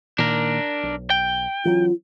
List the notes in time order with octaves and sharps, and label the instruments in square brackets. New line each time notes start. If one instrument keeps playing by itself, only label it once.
[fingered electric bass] A#2 D#3 A#3 [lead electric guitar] D4 A#4
[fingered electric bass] B1
[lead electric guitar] G5
[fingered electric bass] E3 F#3 C#4 [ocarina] F4